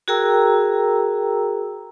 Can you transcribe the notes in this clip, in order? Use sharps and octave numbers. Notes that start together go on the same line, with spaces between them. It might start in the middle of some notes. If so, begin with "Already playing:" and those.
F#4 G#4 A#4 G5 A#5 E6